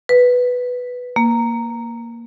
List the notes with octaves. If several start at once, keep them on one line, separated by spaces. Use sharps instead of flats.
B4
A#3